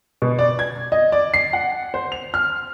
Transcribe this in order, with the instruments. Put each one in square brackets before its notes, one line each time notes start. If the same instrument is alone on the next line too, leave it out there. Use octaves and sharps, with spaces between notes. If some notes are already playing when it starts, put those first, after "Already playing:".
[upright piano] B2
D5
G#6
D#5
D5
C7
F#5
C5
F7
F6